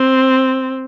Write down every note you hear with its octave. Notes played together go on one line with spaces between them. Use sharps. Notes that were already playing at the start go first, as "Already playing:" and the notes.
Already playing: C4